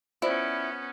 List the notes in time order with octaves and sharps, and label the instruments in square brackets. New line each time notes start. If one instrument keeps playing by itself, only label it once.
[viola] B3 C#4 [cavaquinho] E4 [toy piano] F4 C5 D5